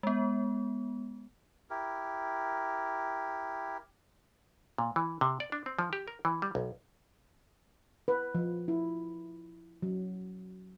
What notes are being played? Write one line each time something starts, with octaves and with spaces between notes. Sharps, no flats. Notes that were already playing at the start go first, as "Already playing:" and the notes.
G#3 B3
E4 G4 A#4
A#2
E3
C3
D5
D4
C4
F3
G4
A#4
E3
G3
B1
B4
F3
E4
F#3